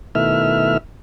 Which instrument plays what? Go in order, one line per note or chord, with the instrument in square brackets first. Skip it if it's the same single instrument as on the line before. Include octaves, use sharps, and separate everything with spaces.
[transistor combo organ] B2 D#3 A3 E4 E5 F6